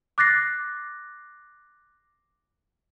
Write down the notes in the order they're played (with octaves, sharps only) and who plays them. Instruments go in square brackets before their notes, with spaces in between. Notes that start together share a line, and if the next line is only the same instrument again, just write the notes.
[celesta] D6 F#6 A6 A#6 C7